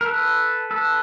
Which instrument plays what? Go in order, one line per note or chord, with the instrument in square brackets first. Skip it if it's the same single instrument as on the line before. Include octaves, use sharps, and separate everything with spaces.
[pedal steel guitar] A#4
A4 B4
A4 B4